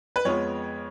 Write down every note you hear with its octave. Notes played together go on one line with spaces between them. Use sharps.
B4
F2 F3 G#3 B3 C#5